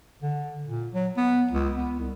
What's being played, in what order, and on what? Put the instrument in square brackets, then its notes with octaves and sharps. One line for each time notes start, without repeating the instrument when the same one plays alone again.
[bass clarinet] D3
A#2
F#3
B3
C#2
B3
C2